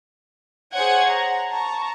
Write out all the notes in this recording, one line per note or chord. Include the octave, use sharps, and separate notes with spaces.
G#4 C5 C#5 F#5 G#5 G#6
F#5 A#5
A5 A#5 C#6